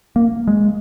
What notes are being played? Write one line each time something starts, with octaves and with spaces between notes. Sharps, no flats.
A#3
G#3